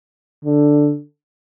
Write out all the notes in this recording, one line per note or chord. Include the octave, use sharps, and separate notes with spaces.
D3